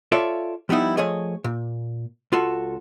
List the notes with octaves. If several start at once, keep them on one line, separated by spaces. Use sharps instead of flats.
F4 A4 C#5 D5 E5 F5
F3 G3 B3 D#4 E4
F3 A3 G#4 C#5 D#5
A#2
C#2 F4 F#4 A4